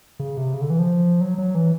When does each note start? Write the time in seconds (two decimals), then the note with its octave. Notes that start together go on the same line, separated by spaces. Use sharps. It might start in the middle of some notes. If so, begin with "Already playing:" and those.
0.19 C#3
0.37 C3
0.54 C#3
0.61 D3
0.70 E3
0.79 F3
1.21 F#3
1.38 F#3
1.55 E3